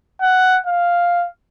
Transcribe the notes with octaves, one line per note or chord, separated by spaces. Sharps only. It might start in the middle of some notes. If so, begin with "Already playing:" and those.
F#5
F5